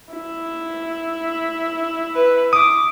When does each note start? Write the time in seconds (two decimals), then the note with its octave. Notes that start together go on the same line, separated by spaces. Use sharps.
0.14 E4
2.15 B4
2.53 D6 D#6